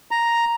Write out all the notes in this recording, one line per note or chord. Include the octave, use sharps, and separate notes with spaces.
A#5